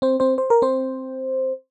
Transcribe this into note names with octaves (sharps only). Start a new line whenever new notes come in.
C4 C5
C4 C5
C5
A#4
C4 C5